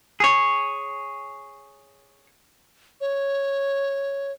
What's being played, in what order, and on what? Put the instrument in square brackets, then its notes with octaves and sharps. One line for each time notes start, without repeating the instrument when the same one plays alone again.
[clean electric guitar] G#4 C#5
[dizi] C#5